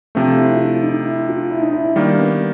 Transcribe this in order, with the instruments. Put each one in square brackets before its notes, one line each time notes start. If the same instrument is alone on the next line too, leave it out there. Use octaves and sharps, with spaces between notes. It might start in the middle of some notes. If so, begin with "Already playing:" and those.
[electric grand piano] C3 F3 A3 [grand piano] C4
[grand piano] E4
F4
E4
D#4
E4
F4
E4
D#4
E4
E4
[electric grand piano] D#3 G3 A#3 [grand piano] D4
[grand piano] B3